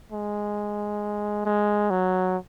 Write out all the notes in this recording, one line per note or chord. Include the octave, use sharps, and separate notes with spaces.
G#3
G#3
F#3